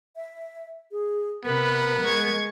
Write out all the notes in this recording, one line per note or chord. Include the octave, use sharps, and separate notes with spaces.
E5
G#4
C3 B3 A#4 B4
G#3 C#6 G#6